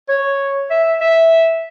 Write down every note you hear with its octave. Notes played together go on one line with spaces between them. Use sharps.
C#5
E5
E5